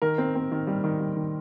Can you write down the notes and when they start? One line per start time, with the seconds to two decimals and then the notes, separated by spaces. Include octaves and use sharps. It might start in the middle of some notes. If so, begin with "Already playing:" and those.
0.02 D#3 A#4
0.18 C4
0.35 C4
0.52 D#3
0.67 G3
0.84 D#3
1.00 G3
1.16 D#3